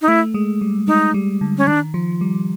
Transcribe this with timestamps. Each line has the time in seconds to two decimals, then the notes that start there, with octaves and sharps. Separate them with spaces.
0.02 D#4
0.08 A3 E4
0.34 G#3
0.61 G3
0.87 G#3 D#4
1.14 G3
1.41 D3
1.58 C#4
1.67 D#3 D4
1.94 F3
2.21 G3